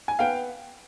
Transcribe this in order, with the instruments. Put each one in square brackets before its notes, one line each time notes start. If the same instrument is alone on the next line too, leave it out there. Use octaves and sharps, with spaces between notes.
[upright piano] G#5
B3 F5 G5